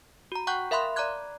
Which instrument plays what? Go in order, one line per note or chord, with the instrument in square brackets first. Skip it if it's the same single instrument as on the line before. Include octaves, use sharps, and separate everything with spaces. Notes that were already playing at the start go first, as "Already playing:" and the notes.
[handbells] F#4 A#5
F#5 G5 C#6 F#6 G6
A#4 E5 F5 B5 C6 F#6
D5 A#5 B5 D6 F#6 G#6